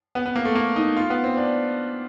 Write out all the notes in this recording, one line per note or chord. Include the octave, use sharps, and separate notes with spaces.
B3
B3
A#3
A3
A#3
D#4
F4
B3
C4
D4